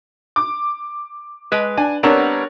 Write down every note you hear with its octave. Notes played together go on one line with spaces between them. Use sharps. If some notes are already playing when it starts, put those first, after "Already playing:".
D6
G#3 B4
D4 G#5
G3 B3 C4 D4 A#4 C#5